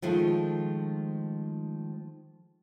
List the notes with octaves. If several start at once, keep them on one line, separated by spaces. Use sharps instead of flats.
D#3 F3 G#3 A3